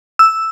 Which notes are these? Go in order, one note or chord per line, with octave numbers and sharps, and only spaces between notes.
E6